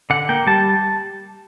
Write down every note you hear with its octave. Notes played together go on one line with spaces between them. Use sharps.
D3 F#5
A#3 G5
G3 A5